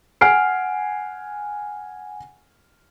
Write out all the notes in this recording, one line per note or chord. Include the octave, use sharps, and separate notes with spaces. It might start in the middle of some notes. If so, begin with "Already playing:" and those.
F#5 G#5 F6 C7 D7